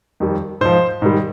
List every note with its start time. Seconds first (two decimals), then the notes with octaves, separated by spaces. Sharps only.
0.20 F2 D#3 G3
0.61 G#2 F3 C5
1.02 G#2 D#3 G3